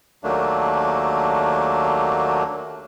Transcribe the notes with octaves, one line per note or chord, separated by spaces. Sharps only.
D#2 F#3 A3 A#3 D4